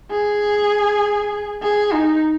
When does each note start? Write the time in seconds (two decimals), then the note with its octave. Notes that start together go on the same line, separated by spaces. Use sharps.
0.11 G#4
1.62 G#4
1.92 D#4